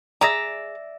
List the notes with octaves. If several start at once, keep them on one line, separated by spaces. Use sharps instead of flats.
G#4 D5 E5 A#5 A#6